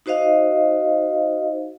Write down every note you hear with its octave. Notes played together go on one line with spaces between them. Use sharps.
D#4 F#4 C5 D#5 F5